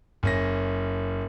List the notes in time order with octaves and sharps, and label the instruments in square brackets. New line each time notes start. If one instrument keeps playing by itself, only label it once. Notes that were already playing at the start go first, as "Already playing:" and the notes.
[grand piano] F#1 C#4 A#6